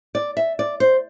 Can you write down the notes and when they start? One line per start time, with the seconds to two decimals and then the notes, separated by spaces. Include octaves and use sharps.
0.15 D5
0.37 E5
0.59 D5
0.80 C5